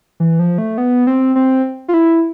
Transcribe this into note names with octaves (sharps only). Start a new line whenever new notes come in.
E3
F3
A3
B3
C4
C4
F4
E4